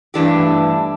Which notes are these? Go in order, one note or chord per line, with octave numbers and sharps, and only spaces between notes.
G2 E3 A3 D4 G4